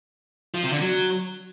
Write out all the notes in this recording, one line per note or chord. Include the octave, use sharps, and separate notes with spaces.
F3
C3
D3
F#3